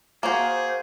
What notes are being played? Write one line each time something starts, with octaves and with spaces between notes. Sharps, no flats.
A#3 F#4 G#4 C5